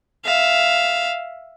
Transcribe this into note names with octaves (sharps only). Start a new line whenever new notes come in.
E5 F5